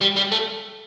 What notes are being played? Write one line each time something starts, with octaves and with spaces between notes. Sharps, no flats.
G3
G3
A3